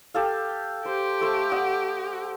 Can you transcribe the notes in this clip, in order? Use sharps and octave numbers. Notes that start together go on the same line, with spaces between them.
G4 A4 F5
G4 C5
A3 C5
D#5 F#5